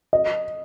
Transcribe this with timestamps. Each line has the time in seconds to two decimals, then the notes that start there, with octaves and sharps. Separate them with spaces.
0.13 D#5